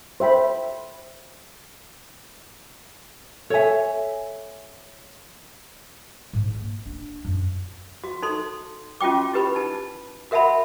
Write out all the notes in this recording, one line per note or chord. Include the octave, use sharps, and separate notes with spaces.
C5 E5 G5 B5
A4 C#5 E5 G#5
G#2
A#3
D4
F#2
F#4
D#4 A4 C6
C#4 F4 F#4 G5 D6
E4 G4 B4 B5
D#4 A5
F#4 A#4 E5 F#5 A5 B5